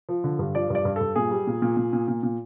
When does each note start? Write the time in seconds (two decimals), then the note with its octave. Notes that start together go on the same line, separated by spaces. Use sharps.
0.09 F3
0.24 D3
0.39 G2
0.55 F3 D5
0.70 G2 D5
0.85 G2
0.96 G2 A4
1.15 A#2 G#4
1.31 G3
1.47 A#2
1.62 A#2
1.77 A#2
1.93 A#2
2.08 A#2
2.23 A#2